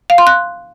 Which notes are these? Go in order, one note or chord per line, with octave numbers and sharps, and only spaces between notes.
F5
C6
F#6